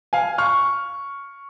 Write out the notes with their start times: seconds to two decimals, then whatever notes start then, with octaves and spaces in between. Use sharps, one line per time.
0.13 F5 G#5
0.38 C#6 F6